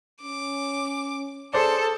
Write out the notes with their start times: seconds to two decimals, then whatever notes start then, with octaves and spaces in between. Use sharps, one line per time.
0.22 C#4 D6
1.53 G#4 A4 C5 D5